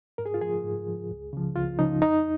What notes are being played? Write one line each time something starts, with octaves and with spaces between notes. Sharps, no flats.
G#2 A#4
G#4
F4
F3 G#4
G#2
F3
C#2
C#3 F3
C#2 F4
C#3 F3 D#4
F2 D#4